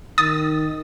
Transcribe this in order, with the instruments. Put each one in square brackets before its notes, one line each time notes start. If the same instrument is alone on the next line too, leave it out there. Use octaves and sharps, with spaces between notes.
[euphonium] D#3 [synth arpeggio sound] D#6 A6